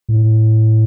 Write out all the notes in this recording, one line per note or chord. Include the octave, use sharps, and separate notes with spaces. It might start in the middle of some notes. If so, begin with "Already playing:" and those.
A2